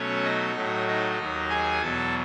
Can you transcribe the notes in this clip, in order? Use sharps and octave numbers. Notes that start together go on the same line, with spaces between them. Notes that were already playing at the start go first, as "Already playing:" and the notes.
Already playing: B2 F#3 A3 C#4 C#5
D#4 D#5
A2 F#3 A3
D#4 D#5
D#2 D#3 F#3
G#4 G#5
E2 B2 F#3 A4 A5